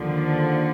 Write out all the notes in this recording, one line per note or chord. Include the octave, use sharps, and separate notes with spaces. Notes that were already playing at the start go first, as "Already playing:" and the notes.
Already playing: D#2 D3 F3